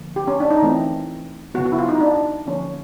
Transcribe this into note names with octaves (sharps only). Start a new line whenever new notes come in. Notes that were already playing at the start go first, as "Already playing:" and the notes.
Already playing: D3 F3 A#3
G4
C#4
D4
D#4
E3 A3 C4
C#3 F#3 B3 F#4
F#4
E4
F4
D#4
D4
D3 F3 A#3 C#4